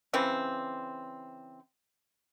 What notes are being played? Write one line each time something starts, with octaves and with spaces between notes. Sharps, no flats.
C#3 E3 C4